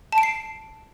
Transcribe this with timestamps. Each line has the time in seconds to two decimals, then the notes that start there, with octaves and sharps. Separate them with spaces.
0.12 A5
0.18 D7
0.23 C7